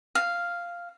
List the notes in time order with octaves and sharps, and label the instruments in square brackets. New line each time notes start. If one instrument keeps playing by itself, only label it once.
[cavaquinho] F5